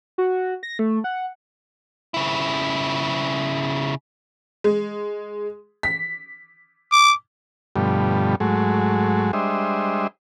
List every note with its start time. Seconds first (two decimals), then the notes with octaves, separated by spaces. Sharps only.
0.18 F#4
0.63 A#6
0.79 A3
1.04 F#5
2.14 C#3 E4
4.64 G#3
5.83 B6
6.92 D6
7.76 G2 B2 D3 F3 G3 A3
8.40 G#2 F#3 G#3 A3
9.33 G3 G#3 D4 C5 D#5 E5